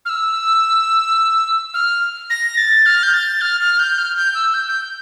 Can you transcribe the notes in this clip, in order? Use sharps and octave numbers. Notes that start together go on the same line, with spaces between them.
F6
E6
F6
A#6
A6
F6
G6
A6
F6
F6
G6
F6
G6
E6
G6
G6